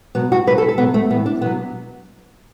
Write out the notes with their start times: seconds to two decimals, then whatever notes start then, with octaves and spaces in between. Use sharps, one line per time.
0.15 B2 F#3 B3
0.32 F#4
0.47 B2 F#3 B4
0.58 A4
0.68 A4
0.78 B2 F#3 B3
0.94 A3
1.10 A2 E3 B3
1.26 D4
1.42 B2 F#3 B3